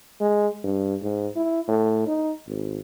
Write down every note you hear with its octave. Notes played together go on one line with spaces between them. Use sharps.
G#3
G2
G#2
E4
A2
D#4
G#1